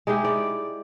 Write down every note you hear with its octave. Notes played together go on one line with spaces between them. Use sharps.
G#3 D#4 E4 G4
D5